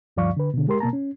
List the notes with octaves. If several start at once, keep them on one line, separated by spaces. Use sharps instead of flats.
D2 G2 F3 D5 F5 C#6
D3 B4
B2 D3
G#3 G4 A#4 C6
B2 A#3 A5 A#5
C#4